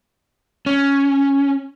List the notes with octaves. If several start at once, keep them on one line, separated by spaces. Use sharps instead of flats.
C#4